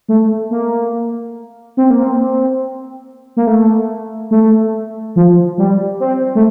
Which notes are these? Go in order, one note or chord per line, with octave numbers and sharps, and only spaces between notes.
A3
A#3
C4
A#3
C4
A#3
A3
A3
F3
G3
C4
A3